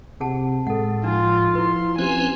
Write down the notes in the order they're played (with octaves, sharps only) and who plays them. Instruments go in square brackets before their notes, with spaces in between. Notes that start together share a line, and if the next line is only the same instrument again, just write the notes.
[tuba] C3 [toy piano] G#4 F#5 A5
[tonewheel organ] A2 [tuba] G#3 [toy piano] A4 F#5
[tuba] F3 [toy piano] D4 D#4 [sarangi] F4
[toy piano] E4 B4 [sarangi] C6
[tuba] F3 [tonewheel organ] C4 C#4 B4 [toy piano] G4 C5 [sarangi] G#5